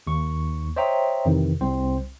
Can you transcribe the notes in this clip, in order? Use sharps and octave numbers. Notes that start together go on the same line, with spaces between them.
D#2 C#6
C5 C#5 D#5 E5 G5 A#5
F2 C3 D#3 E3
C2 C4 C5